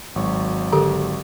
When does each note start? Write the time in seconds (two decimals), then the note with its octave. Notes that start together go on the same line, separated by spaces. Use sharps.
0.16 G#1 F#3 C#6
0.73 D3 G4 A4